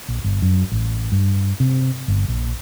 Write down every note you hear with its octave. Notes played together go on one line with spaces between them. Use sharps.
A#1
G1
F#2
A1
G2
C3
G1
A#1